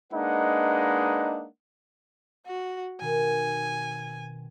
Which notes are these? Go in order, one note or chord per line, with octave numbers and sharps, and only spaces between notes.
G#3 A#3 D4 D#4 B4 F#5
F#4
B2 D#3 C4 G#5